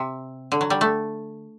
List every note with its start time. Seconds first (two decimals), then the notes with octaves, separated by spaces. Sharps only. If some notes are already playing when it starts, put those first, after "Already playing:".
Already playing: C3
0.52 D3
0.61 F#3
0.70 G3
0.81 A3